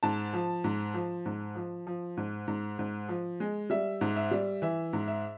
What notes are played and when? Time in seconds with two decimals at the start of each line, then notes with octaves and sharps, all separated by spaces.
0.03 G#2 A5
0.33 F3
0.64 G#2
0.94 F3
1.26 G#2
1.55 F3
1.87 F3
2.17 G#2
2.48 G#2
2.79 G#2
3.09 F3
3.40 G#3
3.70 G3 E5
4.01 G#2
4.16 E5
4.31 G3
4.62 E3 E5
4.93 G#2
5.08 E5